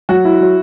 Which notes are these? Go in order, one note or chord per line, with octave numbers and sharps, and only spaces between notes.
F#3 F#4
E4
F#3